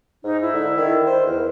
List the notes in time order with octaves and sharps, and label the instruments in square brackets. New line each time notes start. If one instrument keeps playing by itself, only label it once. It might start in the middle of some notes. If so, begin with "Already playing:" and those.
[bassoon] G#2 [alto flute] D#4
[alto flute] E4
[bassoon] D3
D#3
[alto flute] E4 [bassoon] C5
[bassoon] E2 [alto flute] A#4